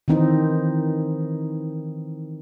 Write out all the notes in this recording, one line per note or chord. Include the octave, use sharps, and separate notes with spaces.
D#3 E3 C4 D#4